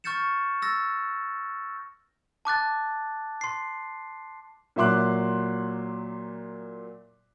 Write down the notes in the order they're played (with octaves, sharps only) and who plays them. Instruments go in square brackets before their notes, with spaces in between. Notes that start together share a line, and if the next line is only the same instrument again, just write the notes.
[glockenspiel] C#6 F6 G6 A6 C#7 E7
E6 A6 A#6
A5 D6 F#6 A6
C6 C7
[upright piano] A#2 F#3 E5 C6 D6 F#6